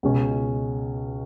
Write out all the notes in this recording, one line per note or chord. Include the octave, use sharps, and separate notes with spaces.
C#2 B2 G#3 C#4